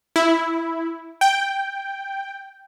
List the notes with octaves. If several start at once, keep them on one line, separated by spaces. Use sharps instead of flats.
E4
G5